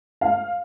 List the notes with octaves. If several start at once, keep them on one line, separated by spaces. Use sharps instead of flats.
F5